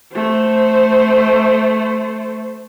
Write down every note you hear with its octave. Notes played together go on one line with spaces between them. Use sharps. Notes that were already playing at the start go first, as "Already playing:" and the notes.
A3 C5